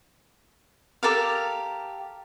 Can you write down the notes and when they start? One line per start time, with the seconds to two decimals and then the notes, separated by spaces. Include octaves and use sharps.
1.03 G4 A4 A#4 F5